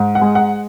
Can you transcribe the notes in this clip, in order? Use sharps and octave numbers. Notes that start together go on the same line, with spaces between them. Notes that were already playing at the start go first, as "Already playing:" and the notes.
Already playing: G#2
F#5
G#3
F#5